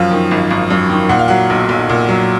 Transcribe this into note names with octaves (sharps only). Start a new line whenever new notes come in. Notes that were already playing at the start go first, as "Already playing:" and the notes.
Already playing: F#2 F3 F5
D#3
G#1
G#1
F#2
D#3
A#2 F#5
F5
F#3 F#5
B1
B1
A#2
F#3